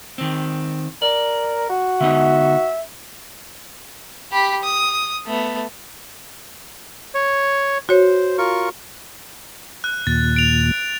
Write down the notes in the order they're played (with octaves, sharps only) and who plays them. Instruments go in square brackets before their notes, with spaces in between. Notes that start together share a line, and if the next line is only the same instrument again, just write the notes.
[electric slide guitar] D#3 C4
[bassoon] A#4 [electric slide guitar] D5
[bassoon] F#4
[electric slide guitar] D3 B3 D#4 [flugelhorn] E5
[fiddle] G4 B5
D#6
A3 B3
[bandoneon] C#5
[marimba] F#4 C#5 [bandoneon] C5
[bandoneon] F4 A#4 C#6
[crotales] F#6
[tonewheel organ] D#2 A#2 [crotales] A6
[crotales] D7 F7